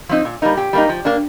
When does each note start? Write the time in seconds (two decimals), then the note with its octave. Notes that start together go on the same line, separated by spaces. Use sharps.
0.09 F3 C4 D#4
0.25 A#2
0.42 G3 A#3 D#4
0.57 A#2 G4
0.73 G3 A#3 D#4
0.89 F3
1.05 A#3 D4